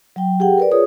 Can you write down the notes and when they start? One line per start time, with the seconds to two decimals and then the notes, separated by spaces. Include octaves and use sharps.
0.16 F#3 G5
0.40 G4 G#4 F#5 G5
0.58 A#4 B4 D5
0.72 F4 G#4 C#5 D#6